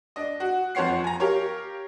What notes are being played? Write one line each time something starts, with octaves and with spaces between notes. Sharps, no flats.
D4 D#5
F#4
F2 F3 C5 C#5 F#5 C7
G#5 A#5
G4 A#4 C#5 F5